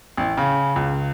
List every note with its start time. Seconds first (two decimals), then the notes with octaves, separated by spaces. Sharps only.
0.17 A1
0.37 C#3
0.76 C#2